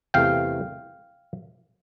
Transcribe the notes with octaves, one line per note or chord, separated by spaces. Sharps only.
E2 C3 E3 A3 F5 G5